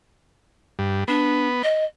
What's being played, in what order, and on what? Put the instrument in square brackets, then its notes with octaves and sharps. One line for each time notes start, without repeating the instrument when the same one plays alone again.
[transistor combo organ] G2
[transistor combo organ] B3 [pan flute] D4
[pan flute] D#5